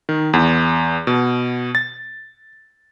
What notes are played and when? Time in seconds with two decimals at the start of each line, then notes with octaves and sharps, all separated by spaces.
0.09 D#3
0.33 E2
1.07 B2
1.75 A6